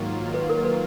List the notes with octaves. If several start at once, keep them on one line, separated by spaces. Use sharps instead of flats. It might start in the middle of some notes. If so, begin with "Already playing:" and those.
Already playing: G#2 D#3 F#3 A#3 F4
B4
A#4
B4